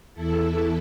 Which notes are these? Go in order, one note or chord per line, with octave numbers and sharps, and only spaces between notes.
E2 E3 E4 A4